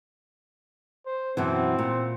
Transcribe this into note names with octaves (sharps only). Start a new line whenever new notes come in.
C5
F#2 B2 E3 C4
A#2